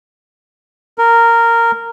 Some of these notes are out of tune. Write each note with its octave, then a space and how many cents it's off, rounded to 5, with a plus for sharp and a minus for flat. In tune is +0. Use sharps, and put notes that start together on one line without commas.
A#4 -10